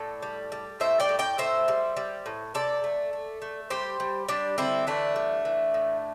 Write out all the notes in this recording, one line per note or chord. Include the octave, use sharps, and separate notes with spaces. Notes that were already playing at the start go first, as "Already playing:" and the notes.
Already playing: A2 A4 D5
G3
G3
A2 C5 E5
D5 G5
A2
D5 G5
A2 C5 E5
G3
G3
A2
C3 A4 D5
A3
A3
A3
G3 G4 C5
G3
G3 D4 G4
D3 C4 E4
E3 A3 D4
G3
E3
A2